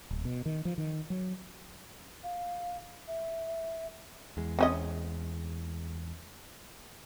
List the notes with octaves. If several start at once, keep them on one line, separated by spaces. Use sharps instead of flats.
D1
B2
D#3
F3
D#3
F#3
F5
E5
E2 G#3
C4 C#4 D#5